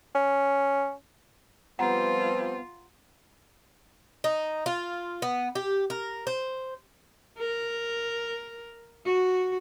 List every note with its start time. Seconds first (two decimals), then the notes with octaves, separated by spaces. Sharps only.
0.15 C#4
1.79 F3 G3 B3 C4 F4 F#5 A#5
4.24 D#4
4.66 F4
5.22 B3
5.55 G4
5.90 A#4
6.27 C5
7.39 A#4
9.05 F#4